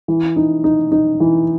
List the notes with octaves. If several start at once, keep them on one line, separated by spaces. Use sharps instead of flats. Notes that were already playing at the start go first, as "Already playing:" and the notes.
E3
D#4
D#4
D#4
E3